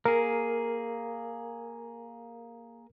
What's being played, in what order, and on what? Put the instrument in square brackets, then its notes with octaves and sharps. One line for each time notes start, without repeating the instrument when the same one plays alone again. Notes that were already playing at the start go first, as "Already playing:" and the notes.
[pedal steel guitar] A#3 G#4 [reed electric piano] A#4